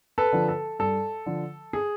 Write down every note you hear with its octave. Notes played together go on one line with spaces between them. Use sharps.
A4 B4
D3 F3
A4
G2 A4
D3 F3
G#4